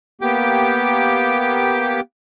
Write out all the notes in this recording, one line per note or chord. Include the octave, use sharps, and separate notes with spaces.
A#3 B3 G4 G5 D6